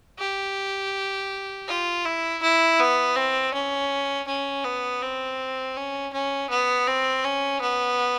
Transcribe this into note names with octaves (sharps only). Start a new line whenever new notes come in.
G4
F4
E4
E4
B3
C4
C#4
C#4
B3
C4
C#4
C#4
B3
C4
C#4
B3